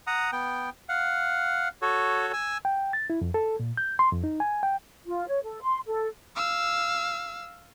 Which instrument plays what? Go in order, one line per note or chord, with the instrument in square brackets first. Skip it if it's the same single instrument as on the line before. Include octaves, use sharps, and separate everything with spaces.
[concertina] F#5 A#5 D#6
B3 G5
F5 F#5
F#4 A4 C#5
G#5 E6
[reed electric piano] G5
A6
E4
F2
A4
A#2
G6
C6
F2
D#4
G#5
G5
[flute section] F4
C#5
A4
C6
A4
[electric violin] F5 E6